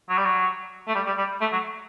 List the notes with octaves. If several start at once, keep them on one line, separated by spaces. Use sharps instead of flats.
F#3
G3
F#3
A3
G3
G3
G3
A3
F#3